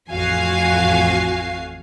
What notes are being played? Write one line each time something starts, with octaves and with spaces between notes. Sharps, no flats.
A1 F2 F#4 F5 G#5 C7